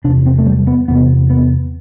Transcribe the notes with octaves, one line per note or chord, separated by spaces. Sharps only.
E2 C3 D4
C4
A3
G3
B3
E2 C3 B3
B3